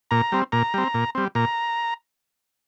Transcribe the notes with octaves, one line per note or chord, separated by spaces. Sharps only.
A#2 A#5
G3 C4
A#2 A#5
G3 C4
A#2
G3 C4
A#2 A#5